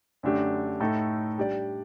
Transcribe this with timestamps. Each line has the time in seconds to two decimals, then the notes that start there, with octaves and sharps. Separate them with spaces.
0.23 F#2 D3 A3 D4 G4
0.80 A2 A3 D#4 A4
1.38 G3 D4 G4 D5